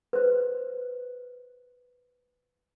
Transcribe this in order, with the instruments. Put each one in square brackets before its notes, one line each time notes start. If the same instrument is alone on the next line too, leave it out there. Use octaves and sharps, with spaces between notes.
[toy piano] B4 C5